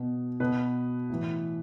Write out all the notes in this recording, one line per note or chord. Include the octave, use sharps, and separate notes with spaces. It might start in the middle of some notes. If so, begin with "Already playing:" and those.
Already playing: B2
B2 B4
A2 E3